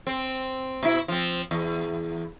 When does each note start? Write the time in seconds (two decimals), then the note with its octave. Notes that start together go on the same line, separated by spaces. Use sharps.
0.07 C4
0.83 B2 E4
1.08 F3 C4
1.51 E2